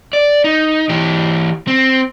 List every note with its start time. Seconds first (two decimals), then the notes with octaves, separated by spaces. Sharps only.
0.13 D5
0.44 D#4
0.89 E3 G4
1.67 C4